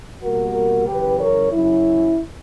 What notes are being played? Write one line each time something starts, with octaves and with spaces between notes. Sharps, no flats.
B2 G3 A#3 F#4 A#4
F#2 C#3 E3 G4 B4
A#4 C#5
F#2 C#3 F#3 C#4 E4